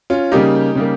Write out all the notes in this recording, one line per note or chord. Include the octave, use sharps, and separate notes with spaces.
C#4 F4
C#3 G3 A#3 D#4 G4
C#3 G3 A#3